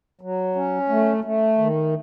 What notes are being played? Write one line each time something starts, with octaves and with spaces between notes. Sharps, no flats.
F#3
C#4
A3
A3
D#3